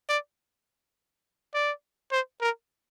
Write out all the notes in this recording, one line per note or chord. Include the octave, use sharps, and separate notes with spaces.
D5
D5
C5
A#4